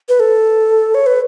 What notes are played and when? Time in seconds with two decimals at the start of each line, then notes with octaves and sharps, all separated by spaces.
0.09 B4
0.20 A4
0.94 C#5
1.06 B4